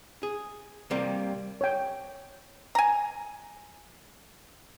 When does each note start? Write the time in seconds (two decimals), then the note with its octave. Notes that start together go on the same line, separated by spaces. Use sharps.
0.23 G#4
0.91 C3 G3 A#3
1.61 C#5 G5
2.75 G#5 A#5